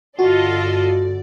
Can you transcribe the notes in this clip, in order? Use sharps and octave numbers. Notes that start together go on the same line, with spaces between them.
G1 D3 F4 F#4 A4 D5 D#5